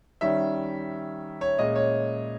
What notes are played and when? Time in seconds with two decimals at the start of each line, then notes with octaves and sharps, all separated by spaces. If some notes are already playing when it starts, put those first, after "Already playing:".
0.21 D#3 G3 C#4 E5
1.41 C#5
1.59 A#2 G#3 C#4 D#5
1.75 C#5